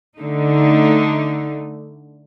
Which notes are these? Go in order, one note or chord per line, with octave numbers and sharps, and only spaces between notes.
D3 A3 D#4